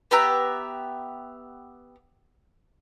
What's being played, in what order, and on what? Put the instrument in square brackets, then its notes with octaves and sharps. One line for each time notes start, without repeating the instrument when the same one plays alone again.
[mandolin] B3 G4 E5 A#5